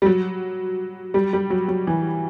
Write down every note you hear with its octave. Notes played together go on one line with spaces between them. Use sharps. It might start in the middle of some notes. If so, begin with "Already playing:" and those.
G3
F#3
G3
G3
F#3
F#3
E3